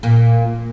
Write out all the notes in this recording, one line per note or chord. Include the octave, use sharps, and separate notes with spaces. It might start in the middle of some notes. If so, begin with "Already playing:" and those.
A#2 A#3